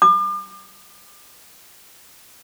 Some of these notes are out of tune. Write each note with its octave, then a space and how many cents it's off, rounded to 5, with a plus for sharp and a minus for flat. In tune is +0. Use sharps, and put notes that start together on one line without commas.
D6 +40